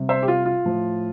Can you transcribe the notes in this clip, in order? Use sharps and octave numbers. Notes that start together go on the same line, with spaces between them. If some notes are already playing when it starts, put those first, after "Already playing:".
Already playing: C3 G3
C5 E5
G4
F4
F4
A2 F3